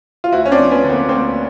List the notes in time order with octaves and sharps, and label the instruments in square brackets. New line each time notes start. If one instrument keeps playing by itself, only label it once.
[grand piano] F4
D2 E4 F#4
C#4
C4 D4
F3
B3 C#4
D3
A#3 C4
D2 A#3 C4